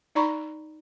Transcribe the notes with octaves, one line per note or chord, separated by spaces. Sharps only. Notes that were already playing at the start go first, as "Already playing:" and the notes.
D#4 D5 A#5 B5 C#6